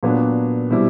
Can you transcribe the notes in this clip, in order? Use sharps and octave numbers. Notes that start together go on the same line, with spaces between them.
A#2 F#3 B3 D4
B2 G3 C4 E4